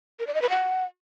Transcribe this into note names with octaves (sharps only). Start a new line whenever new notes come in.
A#4
D5
D#5
B4
F#5